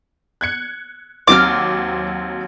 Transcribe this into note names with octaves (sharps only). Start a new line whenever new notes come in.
F#6 G#6 C#7
D#2 F#3 C4 D6 F6